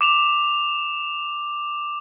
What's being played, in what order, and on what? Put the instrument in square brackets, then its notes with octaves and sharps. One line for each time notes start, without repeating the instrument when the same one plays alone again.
[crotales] D6 E7 F7